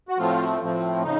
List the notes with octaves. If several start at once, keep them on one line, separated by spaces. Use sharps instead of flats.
F#4
A2 F3 A3 C4 F4
A2 F3 A3 C4
C#3 D#4